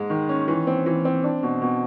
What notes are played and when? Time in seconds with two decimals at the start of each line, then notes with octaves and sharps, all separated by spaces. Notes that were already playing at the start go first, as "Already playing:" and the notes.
Already playing: G#2 G#3
0.10 D#3
0.29 C#4
0.48 E3
0.67 C4
0.86 E3
1.05 C4
1.24 D4
1.43 B2
1.62 B2